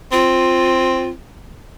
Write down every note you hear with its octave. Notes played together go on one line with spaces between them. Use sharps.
C4 F4